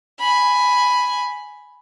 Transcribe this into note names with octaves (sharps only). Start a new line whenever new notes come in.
G#5 B5